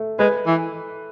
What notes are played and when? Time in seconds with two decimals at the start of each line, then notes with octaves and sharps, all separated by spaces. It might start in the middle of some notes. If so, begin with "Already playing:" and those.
Already playing: A3
0.19 G#3 B4
0.46 E3